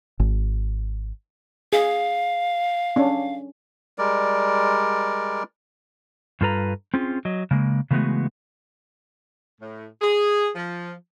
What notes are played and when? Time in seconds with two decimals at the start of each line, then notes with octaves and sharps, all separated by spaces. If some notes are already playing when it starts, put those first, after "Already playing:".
0.20 G#1
1.73 G#4 F5
2.96 C#4 D4
3.98 G3 G#3 A#4 D5
6.41 G2 G3 F4 A4 B4 A#5
6.94 C4 C#4 F4 G#4
7.25 F#3 D#5
7.51 C#3 G#3 A#3
7.91 C#3 E3 G#3 A3 B3 F#4
9.61 A2
10.01 G#4
10.55 F3